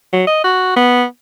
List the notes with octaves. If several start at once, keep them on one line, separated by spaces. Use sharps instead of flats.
F#3
D#5
F#4
B3